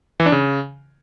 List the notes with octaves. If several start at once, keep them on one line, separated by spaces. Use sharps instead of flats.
E3
D4
C#3